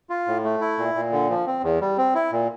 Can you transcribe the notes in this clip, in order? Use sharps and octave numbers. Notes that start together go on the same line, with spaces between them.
F4
A2
A3
E4
A#2
A#2
D3
F3
C4
E2
G3
C4
E4
A#2